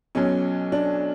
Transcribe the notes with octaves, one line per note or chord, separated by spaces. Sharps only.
B1 B2 F#3 C#4
D4